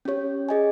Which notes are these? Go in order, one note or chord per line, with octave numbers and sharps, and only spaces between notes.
C#4 G4 C#5
G#4 D#5 G#5